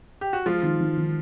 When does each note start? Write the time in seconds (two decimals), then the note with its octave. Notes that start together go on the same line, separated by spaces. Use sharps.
0.21 G4
0.33 F#4
0.46 F3 G#3 F4
0.63 D#3
0.81 D#3
0.97 D#3